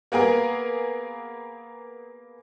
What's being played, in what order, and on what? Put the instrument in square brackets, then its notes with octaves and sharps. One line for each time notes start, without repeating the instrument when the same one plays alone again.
[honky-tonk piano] A#3 B3 G#4 A#4